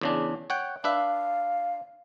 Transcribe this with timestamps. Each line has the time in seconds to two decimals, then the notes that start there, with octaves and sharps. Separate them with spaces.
0.01 E2 C#3 D4
0.50 C#5 F#5 G5
0.84 D4 B4 E5 F5